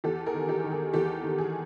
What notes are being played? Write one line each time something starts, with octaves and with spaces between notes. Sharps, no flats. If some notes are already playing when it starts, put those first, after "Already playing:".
E2 G4 A4
G#4 A#4
D#3
G4 A4
D#3
G#4
E2 G4 A4
D#3
G#4